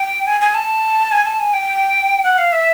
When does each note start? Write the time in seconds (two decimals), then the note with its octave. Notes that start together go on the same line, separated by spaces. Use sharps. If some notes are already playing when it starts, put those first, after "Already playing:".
Already playing: G5
0.27 G#5
0.41 G#5
0.54 A5
1.12 G#5
1.25 A5
1.40 G#5
1.54 G5
2.24 F#5
2.38 F5
2.52 E5